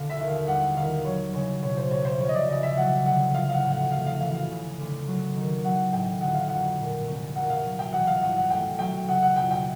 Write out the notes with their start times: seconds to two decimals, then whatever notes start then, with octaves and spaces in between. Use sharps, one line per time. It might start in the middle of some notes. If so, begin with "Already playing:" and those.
Already playing: D3 F5
0.10 E5
0.19 D#2
0.29 F5
0.48 G3 F#5
0.76 D#3 F5
1.05 F#3 C#5
1.34 C#3 C#5
1.62 B2 C#5
1.77 C5
1.91 C2 C#5
2.05 C5
2.20 F3 C#5
2.29 D#5
2.35 D5
2.49 C#3 D#5
2.63 E5
2.77 F#3 F#5
3.06 D3 F#5
3.34 F3 F5
3.49 F5
3.54 F#5
3.64 A2
3.72 F#5
3.92 A3 F5
4.07 F5
4.20 E3 F5
4.34 F5
4.49 C#3
4.78 D2
5.07 F#3
5.36 D#3
5.63 F#3 F#5
5.93 A2 G5
6.21 D3 F#5
6.34 F5
6.48 F2 F#5
6.78 A#2
7.07 C2
7.36 A#3 F#5
7.50 F5
7.65 F#3
7.79 G5
7.93 E3 F#5
8.07 F5
8.21 G2 F#5
8.37 F#5
8.50 A3 G5
8.79 F#3 G5
9.08 C#3 F#5
9.23 F#5
9.36 F2 G5
9.51 G5